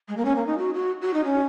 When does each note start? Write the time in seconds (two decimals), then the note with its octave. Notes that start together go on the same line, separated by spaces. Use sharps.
0.08 G#3
0.17 A#3
0.25 C#4
0.35 A#3
0.46 D#4
0.58 F#4
0.74 F#4
1.02 F#4
1.14 D#4
1.24 C#4